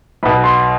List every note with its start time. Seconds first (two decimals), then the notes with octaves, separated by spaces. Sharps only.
0.23 B1 B2 B5
0.44 C6